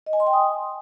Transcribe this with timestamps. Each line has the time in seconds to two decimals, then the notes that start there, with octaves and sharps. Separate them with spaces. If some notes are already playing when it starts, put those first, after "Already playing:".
0.06 D#5
0.13 G#5
0.20 C6
0.27 G5
0.33 D#6